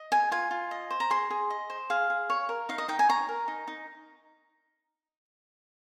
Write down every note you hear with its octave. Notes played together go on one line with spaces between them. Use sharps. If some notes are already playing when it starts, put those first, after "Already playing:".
Already playing: D#5
G#4 G#5
F4 G#5
F4
D#5
C5
A#5
G#4 C6
G#4
D#5
C5
G#4 F5
G#4
C#5
A#4
D#4 F5
D#5
D#4 G5
G#5
C#5 A#5
A#4
D#4
D#4